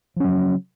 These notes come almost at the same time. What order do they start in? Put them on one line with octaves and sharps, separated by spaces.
F3 C#4 F#3 C#3